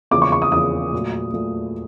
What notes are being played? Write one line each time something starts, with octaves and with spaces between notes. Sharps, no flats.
E2 C#3 F3 A#3 D6
C#6
C#6
D#6
E2 C#3 F3 A#3 D#6
A#2 F#3 A3
A#2 F#3 A3